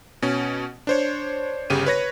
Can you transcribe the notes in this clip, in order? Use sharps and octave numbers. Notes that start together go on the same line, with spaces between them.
B2 C#4
D4 C5 C#5
G1 C#3 G4 D#7
B4 C#5 A#6